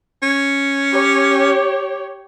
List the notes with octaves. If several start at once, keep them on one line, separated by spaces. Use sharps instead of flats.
C#4
G4 C#5